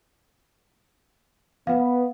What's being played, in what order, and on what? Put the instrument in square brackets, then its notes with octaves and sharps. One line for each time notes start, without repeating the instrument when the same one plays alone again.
[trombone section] B3 [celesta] F5 F#5